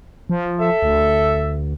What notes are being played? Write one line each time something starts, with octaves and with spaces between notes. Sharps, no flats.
F3
A4 E5
D2